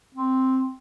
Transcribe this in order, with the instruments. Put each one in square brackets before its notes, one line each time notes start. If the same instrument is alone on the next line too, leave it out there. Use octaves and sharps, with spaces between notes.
[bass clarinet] C4